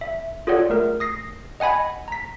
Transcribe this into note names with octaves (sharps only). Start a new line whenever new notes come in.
E5
F4 G#4 A4 C#5 D5 F#5
A3 A#4
D#6 A#6 C7
D#5 F#5 G#5 B5 G#6
A#5 B6